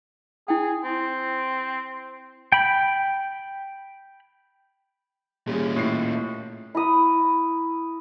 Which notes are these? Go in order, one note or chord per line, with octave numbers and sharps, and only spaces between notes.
E4 G#4 G5
C4
G5 B5
A#2 G3 C#4 G#4
A2 E4 C7
E4 A#5 B5 D#6